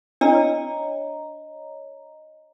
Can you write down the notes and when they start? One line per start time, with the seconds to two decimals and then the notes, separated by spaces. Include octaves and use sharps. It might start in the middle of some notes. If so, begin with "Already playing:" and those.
0.21 D4 C#5 D#5 A#5